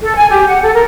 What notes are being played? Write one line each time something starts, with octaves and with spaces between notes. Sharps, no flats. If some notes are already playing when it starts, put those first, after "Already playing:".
A4
G#5
G4
F#5
A4
A#4